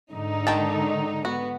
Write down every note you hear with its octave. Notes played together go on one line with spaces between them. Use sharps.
G#2 D3 D#4
D#3 G5 A5
B3 F#4